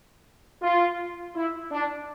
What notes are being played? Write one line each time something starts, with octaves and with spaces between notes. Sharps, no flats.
F4
E4
D4